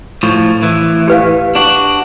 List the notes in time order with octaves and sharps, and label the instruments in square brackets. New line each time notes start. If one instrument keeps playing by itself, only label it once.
[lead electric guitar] A2 F3 [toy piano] C#6
[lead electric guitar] A2 E3
[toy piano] G4 B4 F5
[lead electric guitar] D4 F#4